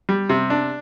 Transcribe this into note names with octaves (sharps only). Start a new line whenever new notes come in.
G3
C3
D4